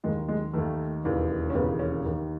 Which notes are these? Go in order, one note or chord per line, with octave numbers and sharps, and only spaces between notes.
D#2 D#3 G#3
G#3
D#2 D#3 A3
E1 D#2 C#3 E3
C#4
E1 D#2 C#3 E3 B3
C#4
D#2 D#3